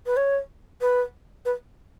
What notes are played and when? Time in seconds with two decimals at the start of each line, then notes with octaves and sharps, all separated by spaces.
0.06 B4
0.17 C#5
0.81 B4
1.45 B4